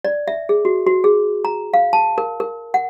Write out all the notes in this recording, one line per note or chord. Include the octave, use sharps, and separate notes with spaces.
D5
E5
G#4
F#4
F#4
G#4
A#5
F5
A5
A#4
A#4
F#5